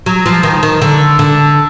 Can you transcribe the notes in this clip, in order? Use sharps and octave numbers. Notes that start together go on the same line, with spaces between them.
F#3
F3
D#3
D#3
D3
D3